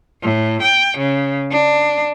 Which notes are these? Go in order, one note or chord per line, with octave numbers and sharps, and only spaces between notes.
A2
G5
C#3
D4